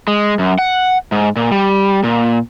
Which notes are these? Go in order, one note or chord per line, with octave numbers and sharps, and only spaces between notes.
G#3
F#2
F#5
G#2
A#2
G3
A#2